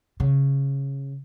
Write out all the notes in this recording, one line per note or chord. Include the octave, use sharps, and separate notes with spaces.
C#3